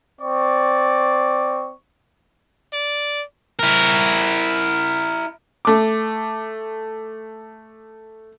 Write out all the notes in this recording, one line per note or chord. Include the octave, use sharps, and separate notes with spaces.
C4 D5 C#6
D5
E4 A#4
A3 D6